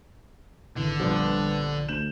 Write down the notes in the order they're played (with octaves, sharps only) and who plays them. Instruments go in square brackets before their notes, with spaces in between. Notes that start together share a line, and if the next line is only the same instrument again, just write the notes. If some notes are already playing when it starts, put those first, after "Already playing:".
[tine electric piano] G#1 [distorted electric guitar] D3 [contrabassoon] E3
[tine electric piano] A#1 [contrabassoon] G2 [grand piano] F3 B3 D5
[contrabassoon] D2 [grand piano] G6 E7 F#7